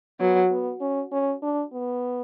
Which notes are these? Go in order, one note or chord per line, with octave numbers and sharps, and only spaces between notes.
F#3 B3
B3
C#4
C#4
D4
B3